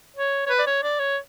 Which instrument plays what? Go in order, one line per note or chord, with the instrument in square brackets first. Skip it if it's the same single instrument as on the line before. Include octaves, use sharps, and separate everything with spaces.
[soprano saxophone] C#5
C#5
B4
D5
C#5
D5
C#5